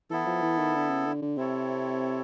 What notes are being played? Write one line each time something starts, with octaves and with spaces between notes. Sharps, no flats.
E3 B3 E4 A4
F3
E3
D#3
D3
C#3
D3
D3
C3 C4 E4 A4 C#5